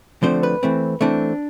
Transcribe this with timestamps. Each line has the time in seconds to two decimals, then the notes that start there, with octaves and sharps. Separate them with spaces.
0.23 D3 F3 A3 C4 C5
0.43 B4
0.63 E3 A3 C4
1.01 E3 A3 C4 D4